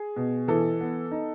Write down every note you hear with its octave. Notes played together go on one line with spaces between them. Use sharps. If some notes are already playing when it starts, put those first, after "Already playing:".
Already playing: G#4
B2
E3 A4
B3
D#4